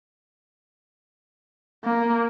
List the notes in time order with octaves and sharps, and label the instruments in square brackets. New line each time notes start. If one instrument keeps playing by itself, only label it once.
[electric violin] A#3